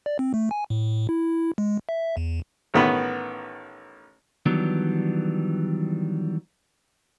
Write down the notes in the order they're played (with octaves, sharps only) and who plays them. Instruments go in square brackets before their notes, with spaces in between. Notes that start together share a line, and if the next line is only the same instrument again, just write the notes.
[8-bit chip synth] D5
C4
A3
G#5
A2
E4
G#3
E5
E2
[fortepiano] A1 D#3 B3 B4 B5
[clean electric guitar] D#3 E3 F#3 G3 B3 D4